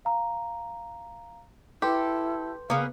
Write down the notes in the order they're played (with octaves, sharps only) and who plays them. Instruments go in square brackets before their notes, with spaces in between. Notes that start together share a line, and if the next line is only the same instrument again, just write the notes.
[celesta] F5 A#5
[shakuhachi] E4 [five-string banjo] G4 [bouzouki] A4 [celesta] B4 C6 G6
[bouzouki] C#3 B3 [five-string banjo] A#3 [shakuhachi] F5